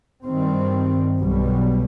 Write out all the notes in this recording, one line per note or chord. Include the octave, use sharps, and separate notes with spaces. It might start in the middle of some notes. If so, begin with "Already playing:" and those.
G2 D#3 G3 C4
B1 B2 G3